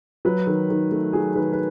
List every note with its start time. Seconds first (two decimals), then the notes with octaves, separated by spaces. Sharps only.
0.25 F#3 B4
0.47 D#3
0.70 D#3
0.92 A3
1.13 F#3 G#4
1.36 D#3 B4
1.53 B4